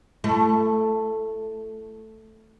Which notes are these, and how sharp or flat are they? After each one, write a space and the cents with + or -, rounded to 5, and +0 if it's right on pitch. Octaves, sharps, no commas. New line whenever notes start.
A3 +0 E4 +40